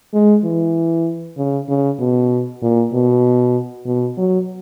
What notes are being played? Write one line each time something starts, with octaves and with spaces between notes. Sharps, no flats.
G#3
E3
C#3
C#3
B2
A#2
B2
B2
F#3